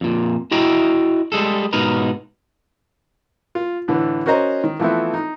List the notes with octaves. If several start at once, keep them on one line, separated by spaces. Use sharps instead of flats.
F2 A#2
E4 F#4 D#5 G5 A#5
G3 G#3 G#4 A4
G#2 B2 D#4 A#4 B4
F4
A2 D3 E3
C#4 F#4 A#4 C5 D#5 A#5
D#3
E3 F3 A3 B3 C4 E4
D#4